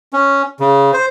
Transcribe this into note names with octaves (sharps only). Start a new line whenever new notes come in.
C#4
C#3
C5